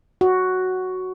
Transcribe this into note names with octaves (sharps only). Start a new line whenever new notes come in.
F#4